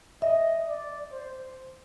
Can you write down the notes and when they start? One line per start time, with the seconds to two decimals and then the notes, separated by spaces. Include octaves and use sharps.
0.22 D#5 E5
0.67 D5
1.12 C5